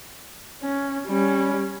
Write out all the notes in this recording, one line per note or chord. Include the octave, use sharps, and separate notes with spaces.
C#4
G3 C#4